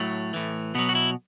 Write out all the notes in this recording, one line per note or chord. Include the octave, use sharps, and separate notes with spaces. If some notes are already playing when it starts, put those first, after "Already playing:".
Already playing: A2 F#3 A3
A2 E3
B2 F#3 B3
F#4
E4